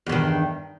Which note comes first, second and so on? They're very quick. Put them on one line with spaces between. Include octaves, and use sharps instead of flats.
E2 G2 D#3